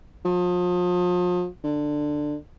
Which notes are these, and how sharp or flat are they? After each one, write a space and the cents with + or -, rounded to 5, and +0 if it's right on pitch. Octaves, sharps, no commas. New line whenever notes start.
F3 +35
D3 +15